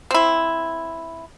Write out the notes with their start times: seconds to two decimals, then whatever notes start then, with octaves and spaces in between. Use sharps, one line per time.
0.11 C4 E4